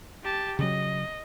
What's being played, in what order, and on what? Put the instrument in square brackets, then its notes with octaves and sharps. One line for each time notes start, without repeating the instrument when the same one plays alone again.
[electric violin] G4 A5
[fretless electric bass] C#3 F#3 [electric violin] D#5